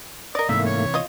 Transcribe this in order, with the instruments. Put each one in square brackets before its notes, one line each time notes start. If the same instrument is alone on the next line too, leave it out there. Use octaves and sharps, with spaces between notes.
[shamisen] A#4 D5 [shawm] D#5
[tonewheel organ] G#2 A3 A#3 [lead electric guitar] C3 E3 [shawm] E5
[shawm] C#5
[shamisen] F4 D#5